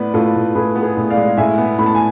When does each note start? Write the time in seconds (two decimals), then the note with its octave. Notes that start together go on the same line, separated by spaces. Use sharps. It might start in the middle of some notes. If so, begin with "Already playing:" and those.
Already playing: A2 B3 B4 D5
0.14 A2 F4 A4
0.35 A2
0.55 A2 G#4 B4
0.76 B3
0.82 G#4 B4
0.97 A2
1.10 D5 F5
1.17 G#3
1.37 A2 E5 G#5
1.58 B3
1.79 A2 B5
1.86 A5
1.95 G#5